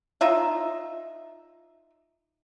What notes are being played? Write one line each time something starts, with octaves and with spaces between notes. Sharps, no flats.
D#4 F4 E5